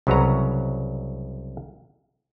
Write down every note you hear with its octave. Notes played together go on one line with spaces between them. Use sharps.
C2 C#3 F#3 B4 C#5 A#5